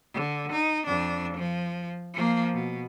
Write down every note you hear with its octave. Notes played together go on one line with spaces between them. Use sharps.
D3
D#4
F2 D4
F3
F3 A#3
B2